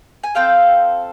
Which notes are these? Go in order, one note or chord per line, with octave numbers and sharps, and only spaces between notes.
G#5
C4 F4 A4 F5 G5